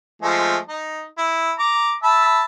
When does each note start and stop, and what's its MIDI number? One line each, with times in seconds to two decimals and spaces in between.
0.22 0.57 53
0.22 0.57 56
0.22 0.57 57
0.69 1.04 63
1.17 1.52 64
1.59 1.94 82
1.59 1.94 86
2.03 2.44 76
2.03 2.44 81
2.03 2.44 83